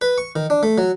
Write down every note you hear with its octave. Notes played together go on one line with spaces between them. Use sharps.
B4
C#6
D#3
D4
A3
F#3